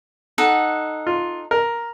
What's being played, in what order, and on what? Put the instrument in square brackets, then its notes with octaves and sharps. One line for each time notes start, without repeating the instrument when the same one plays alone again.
[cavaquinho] D#4 A4 F#5
[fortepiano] F4
A#4